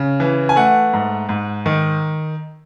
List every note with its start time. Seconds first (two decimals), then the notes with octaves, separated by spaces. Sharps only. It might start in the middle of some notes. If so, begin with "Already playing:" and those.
Already playing: C#3
0.20 E3
0.49 G#5
0.56 A3 F#5
0.93 G#2
1.29 G#2
1.66 D#3